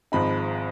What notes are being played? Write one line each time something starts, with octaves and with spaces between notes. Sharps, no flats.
G#1 G#2 F3 C4 D#4 B5